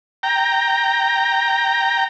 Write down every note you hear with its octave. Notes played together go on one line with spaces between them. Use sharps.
G5 A#5